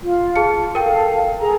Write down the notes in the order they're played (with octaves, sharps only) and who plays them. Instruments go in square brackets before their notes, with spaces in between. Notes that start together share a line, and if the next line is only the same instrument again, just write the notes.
[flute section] F4
[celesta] G#4 A5 C#7
[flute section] A4 F5 [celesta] A#4 G5
[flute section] G#4 A4 A#5